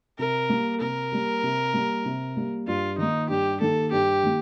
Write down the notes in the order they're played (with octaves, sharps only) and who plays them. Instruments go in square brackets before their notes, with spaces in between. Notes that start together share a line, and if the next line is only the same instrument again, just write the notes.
[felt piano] C3 [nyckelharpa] A#4
[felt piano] G3 A#3
[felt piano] C3 [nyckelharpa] A#4
[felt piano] G3 A#3
C3
G3 A#3
C3
G3 A#3
[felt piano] G2 [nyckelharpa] F4
[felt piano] D#3 A#3 [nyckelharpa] D#4
[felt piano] G2 [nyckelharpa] G4
[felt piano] D#3 A#3 [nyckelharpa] A4
[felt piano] G2 [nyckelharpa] G4
[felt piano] D#3 A#3